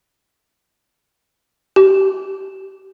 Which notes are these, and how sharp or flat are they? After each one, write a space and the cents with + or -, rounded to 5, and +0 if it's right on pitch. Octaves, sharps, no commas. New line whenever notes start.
G4 -25